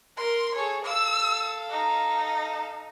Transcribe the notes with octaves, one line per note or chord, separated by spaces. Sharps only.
A#4 C6
G#4 A4 C#5
A4 F5 E6
D#4